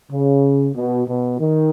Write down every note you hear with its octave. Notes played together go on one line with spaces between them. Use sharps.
C#3
B2
B2
D#3